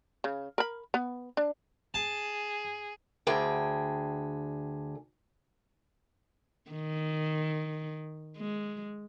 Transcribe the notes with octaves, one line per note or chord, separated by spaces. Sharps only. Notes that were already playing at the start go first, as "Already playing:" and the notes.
C#3
A#4 B5
B3
D4
G#4 A5
D2 D3 G#4 G5
D#3
G#3